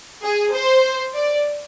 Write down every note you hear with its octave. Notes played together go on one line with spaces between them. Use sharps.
G#4
C5
D5